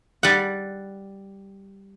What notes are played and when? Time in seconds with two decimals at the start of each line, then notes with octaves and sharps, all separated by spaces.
0.23 G3 F#5